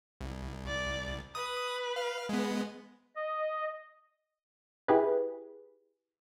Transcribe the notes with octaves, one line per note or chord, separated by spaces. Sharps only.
C2
D5
B4 D#6
F5
G#3 B3
D#5
E4 G4 G#4 B4